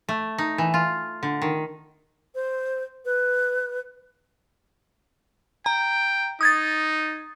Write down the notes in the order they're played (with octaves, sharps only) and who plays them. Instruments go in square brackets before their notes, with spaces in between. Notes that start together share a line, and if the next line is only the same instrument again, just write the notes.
[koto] A3
D#4
E3
F4
D3
D#3
[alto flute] C5
B4
[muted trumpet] G5 [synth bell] A#5
[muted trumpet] D#4 [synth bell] D#6 G#6 A6